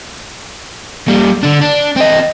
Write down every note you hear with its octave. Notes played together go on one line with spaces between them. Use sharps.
A#2 G3
D3 D4
D4
C4 D#5